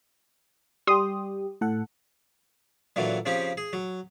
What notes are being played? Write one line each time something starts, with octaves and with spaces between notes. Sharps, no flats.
G3 G4 C6 D#6
A2 A4 F#5
A#2 D3 E3 F#3
C#3 F3 C4 C#4 G4
G#4
F#3